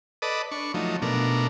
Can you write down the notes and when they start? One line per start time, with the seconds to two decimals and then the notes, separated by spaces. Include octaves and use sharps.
0.22 A4 B4 D5 D#5
0.51 D4 C#6
0.74 F3 F#3 A3 D#4
1.02 B2 A3 D4 A#4